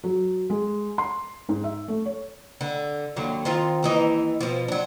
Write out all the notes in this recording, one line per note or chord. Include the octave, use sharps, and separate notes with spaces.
F#3
G#3
C6
G#2
E5
A3
C#5
D3
D#2 D3 F#3
D#3 C4 F4
D#2 E3 D#4
B2 F3
F#3 D4